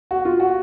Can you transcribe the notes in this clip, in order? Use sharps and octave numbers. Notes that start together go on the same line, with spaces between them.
F#4
F4
F#4